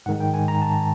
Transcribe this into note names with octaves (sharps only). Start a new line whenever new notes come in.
G#2 D#3 G#3 F#5
G5
G#5
A#5
A5